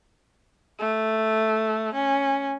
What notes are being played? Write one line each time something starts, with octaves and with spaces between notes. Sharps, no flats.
A3
C#4